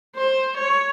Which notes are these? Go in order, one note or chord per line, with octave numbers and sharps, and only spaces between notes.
C5
C#5